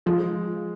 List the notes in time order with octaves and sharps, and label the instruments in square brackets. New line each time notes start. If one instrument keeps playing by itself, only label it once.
[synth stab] F3 [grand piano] G#3